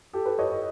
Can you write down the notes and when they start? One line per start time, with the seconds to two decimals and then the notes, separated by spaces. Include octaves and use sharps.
0.13 G4 A4
0.26 A4 B4
0.39 C#5 D#5